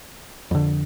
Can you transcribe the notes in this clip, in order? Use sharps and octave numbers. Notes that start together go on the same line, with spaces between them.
F2 D3